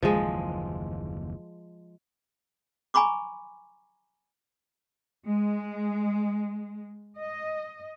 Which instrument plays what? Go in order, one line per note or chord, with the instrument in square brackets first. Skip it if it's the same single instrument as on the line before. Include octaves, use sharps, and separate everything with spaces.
[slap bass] F#1 D#2 E3 [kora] F3 G#3
[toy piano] G#5 A#5 B5 C#6 D6
[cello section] G#3
D#5